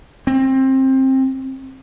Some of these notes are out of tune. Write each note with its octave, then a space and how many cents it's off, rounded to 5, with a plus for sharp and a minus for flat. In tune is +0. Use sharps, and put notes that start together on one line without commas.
C4 +20